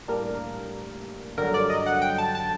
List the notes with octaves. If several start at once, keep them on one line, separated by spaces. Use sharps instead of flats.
A2 G3 A#3 D4 A#4
G2 D3 F#3 A#4
D5
D#5
F#5
G5
A5
A5